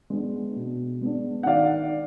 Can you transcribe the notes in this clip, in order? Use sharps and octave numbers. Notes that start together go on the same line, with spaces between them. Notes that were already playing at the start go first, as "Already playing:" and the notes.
G#3 B3 D4
B2
G#3 B3 D4
F#5
D#3 D5 F5